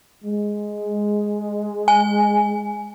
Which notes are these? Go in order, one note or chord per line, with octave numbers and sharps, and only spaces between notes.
G#3
G#5